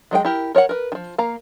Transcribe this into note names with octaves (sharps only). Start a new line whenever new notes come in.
F#3 G#3 A#4 G5
E4 G4 A#4
A#4 C#5 D5 F#5
A#4 B4
D#3 F3
A#3 F5 A#5